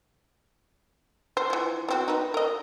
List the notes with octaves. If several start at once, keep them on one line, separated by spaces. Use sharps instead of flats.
C5
E3 F3
B3 C4 F#4
D#4 B4
A#4 D#5